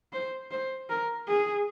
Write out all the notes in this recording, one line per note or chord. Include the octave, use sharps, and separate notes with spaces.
C5
C5
A#4
G#4